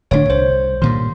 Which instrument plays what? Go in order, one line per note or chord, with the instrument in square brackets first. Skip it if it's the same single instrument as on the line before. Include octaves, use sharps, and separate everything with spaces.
[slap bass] D1 D2 D4 [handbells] C#5
[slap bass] C2 [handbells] C5
[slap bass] G2 A#2 D#3 [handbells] C6